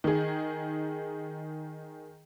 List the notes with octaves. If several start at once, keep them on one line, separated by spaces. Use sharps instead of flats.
D#3 G#4